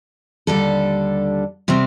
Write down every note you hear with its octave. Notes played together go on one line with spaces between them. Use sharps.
D#2 D3 G3 D4 A4
C3 G3 C4